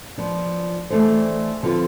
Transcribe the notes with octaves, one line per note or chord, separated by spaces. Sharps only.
F3 B3 D4
E3 A3 D4 A4 C5
D3 F3 C4 F4 B4